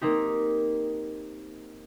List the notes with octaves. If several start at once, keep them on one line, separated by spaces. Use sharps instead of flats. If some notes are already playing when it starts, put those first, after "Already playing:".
A#3 C4 D#4 G4